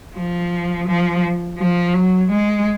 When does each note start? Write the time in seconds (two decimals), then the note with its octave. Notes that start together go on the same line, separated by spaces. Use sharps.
0.16 F3
0.87 F3
1.58 F3
1.94 F#3
2.31 G#3